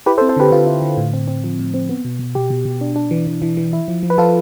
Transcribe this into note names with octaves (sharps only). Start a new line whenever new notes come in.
E4 G4 B4
A4 C5
C4
A4 C5
D3 G4 B4
D3 F4
E4
D3
A2
C4
C4
F3
A2
C4
B3
B2
B2
B2 G4
B2
B2
D4
D4
E3
E3
E3
E3
E4
F3
F3
B4
F3 F4 A4